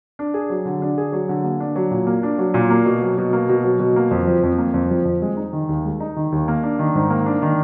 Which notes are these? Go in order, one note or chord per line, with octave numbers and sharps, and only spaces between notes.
D4
G#4
F#3
D3
D4
G#4
F#3
D3
A#3
D4
F#3
A#2
A#3
D4
F#3
A#2
A#3
B2
F#3
B2
A#3
B2
F#3
B2
A#3
F2
F3
F2
A#3
F2
F3
F2
G#3
D#4
D#3
D#2
G#3
D#4
D#3
D#2
A#3
D4
D#3
G#2
A#3
D4
D#3